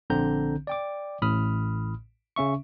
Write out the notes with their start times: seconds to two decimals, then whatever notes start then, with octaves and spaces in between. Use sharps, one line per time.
0.10 A#1 D3 C4 A#5 G6
0.67 D5 G5 D6
1.22 A1 A2 B5 D#6 F6
2.36 C#3 C#4 E5 C#6